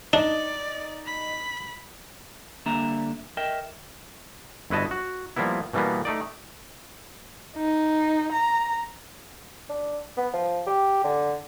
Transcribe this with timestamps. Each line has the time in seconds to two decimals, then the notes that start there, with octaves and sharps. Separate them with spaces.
0.13 D4 D#4 D5
1.06 B5
2.66 D3 G3 A#3 D4 E5 A#5
3.37 A#4 D#5 E5 G5
4.70 G1 E4 F#4 B4 D#5 A5
4.91 F#4
5.36 F3 G3 A#3 B3 E4
5.73 B2 E3 G3 A#3 B3
6.05 A3 D#4 D5
7.56 D#4
8.33 A#5
9.69 D4
10.17 B3
10.34 F3
10.67 G4
11.04 D3